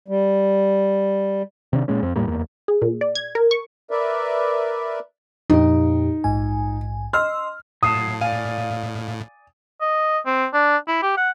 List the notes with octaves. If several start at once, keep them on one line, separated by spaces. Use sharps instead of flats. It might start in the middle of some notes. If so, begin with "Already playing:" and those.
G3
C3 D#3 D4
A#2 G#3 C#4
F2 C4
E1 A2 G3 A#3
F#1 E2 A#3
G#4
A#2
D5
G#6
A#4
C#6
A#4 B4 D5 E5
F2 A#2 D#4 G4
A#1 G#2 G#5
D#5 C6 E6 F6
A2 F#3 F5 A5 D#6
D5 F5 G#5
D#5
C4
D4
E4
G4
F#5